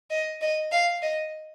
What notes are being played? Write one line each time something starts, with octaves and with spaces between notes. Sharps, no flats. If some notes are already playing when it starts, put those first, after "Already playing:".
D#5
D#5
F5
D#5